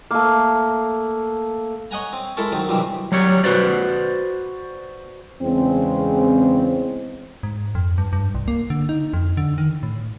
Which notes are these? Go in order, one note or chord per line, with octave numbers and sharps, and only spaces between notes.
A3 A#3
C#5 D#5 F#5 G#5 A#5
C4
G#3 E4 A4 A#4 A5 C#6
D#3 F#3 C4 D#4
C3 D#3 E3 F#3 G3
F#3 G3 C#5
F#4 B4 C5 D5
E2 C#3 G#3 C4
G#2
F2
G2
G2
C2
A#3
D3
D#4
F2
D3
D#3
A2